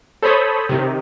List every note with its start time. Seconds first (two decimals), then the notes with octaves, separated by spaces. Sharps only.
0.22 A4 C5 C#5 B5 D#6
0.69 C3 D#3